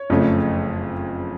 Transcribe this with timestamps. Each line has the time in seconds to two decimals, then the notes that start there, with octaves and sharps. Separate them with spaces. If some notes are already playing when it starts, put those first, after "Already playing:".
Already playing: C#5
0.10 F#1 F2 C#3 F3 A3